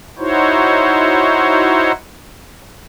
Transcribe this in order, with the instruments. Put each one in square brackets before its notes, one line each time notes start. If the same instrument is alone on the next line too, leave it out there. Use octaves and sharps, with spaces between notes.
[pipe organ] D#4 E4 F#4 C5 C#5